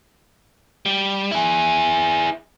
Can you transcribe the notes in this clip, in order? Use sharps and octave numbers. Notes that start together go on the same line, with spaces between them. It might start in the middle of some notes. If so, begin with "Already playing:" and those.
G3
E4 G#4